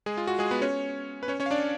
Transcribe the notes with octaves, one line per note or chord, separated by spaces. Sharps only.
G#3 G#4
F4
F#4
G#3 G#4
B3 B4
C#4 C#5
B4
C#4 C#5
C#4 C#5
F5
D4 D5